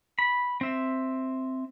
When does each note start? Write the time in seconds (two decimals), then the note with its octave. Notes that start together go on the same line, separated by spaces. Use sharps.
0.19 B5
0.61 C4 E5